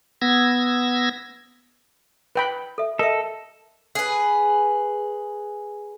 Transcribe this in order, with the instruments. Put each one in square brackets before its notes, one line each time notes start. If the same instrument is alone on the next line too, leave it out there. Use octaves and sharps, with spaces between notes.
[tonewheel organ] B3 E6 G#6 A#6
[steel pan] B4 G5 B5
[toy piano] A4 E5
[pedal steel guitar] A4 [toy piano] A#4 E5 [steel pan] D#5
[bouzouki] G#4 B4